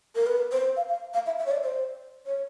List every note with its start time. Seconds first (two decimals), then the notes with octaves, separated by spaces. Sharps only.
0.15 A#4
0.27 B4
0.52 C5
0.76 F5
0.89 F5
1.14 F5
1.26 E5
1.39 E5
1.46 C#5
1.51 D5
1.63 C5
2.26 C#5